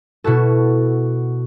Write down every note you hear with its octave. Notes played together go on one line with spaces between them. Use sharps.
B2 E4 F#4 A4